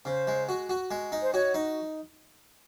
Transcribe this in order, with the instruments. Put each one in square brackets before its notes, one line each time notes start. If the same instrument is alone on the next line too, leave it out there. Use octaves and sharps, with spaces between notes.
[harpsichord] C#3 [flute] C5
[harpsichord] G#3
F#4
F#4
G#3
D#4
[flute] C5
[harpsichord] F#4 [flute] C#5
[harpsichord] D#4